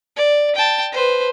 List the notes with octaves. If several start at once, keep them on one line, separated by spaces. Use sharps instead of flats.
D5
G5 A5
B4 C5